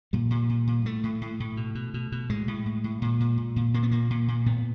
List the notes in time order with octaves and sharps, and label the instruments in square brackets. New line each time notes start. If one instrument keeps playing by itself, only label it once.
[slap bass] A#2 G3
A#2
A#2
A#2
A2 A3
A2
A2
A2
B2
B2
B2
B2
A2 G#3
A2
A2
A2
A#2
A#2
A#2
A#2
A#2 A#3
B3
A#2 A#3
A#2
A#2
A2 B3